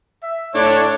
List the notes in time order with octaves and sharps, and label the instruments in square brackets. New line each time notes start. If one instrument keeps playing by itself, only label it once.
[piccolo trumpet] E5
[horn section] A2 D4 [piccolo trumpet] C#5